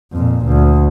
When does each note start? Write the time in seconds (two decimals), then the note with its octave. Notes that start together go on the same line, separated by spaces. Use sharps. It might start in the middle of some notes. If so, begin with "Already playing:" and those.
0.13 F2 A#2
0.46 D2